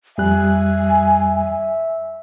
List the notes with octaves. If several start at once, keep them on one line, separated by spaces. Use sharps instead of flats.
F2 G3 E5 G#5 F#6